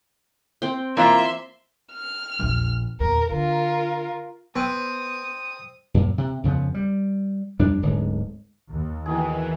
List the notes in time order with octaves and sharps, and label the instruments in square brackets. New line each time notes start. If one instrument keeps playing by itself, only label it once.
[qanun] C4 G5
[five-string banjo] E3 F4 [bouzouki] A#3 A#5 [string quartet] E5 C6
[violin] F6
[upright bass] A#1 E2
[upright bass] E2 A#2 [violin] A#4
[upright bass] D3 [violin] F4 A#4
[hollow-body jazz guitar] B3 [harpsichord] C4 [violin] D#6
[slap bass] F#2 A#2
C3
F2 C#3 F3 B3
G3
F2 G3 D4
D1 G#2 D3 G#3
[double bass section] D#2
[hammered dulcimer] B2 D#3 G#4 [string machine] E3